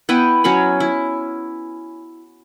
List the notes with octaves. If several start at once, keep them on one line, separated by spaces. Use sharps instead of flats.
B3 E4 B4 G5
F#3 C#4 C#5 B5
E4